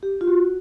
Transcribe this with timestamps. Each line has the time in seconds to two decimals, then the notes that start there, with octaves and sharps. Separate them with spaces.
0.03 G4
0.21 F4
0.28 F#4